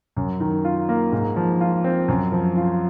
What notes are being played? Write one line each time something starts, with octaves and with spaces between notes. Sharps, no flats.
F#2
D#3
F4
A#3
G#2
F3
F4
C4
F#2
F3
F4